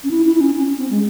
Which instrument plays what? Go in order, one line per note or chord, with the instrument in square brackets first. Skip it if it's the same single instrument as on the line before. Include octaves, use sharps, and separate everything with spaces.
[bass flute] C#4
E4
E4
E4
C#4
C#4
C#4
C4
G#3